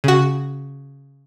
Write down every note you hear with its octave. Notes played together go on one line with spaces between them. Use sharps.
C#3 F#4